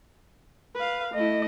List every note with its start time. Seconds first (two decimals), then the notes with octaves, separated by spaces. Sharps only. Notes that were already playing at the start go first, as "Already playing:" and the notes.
0.75 B4 F5
1.14 A3 E4 D#5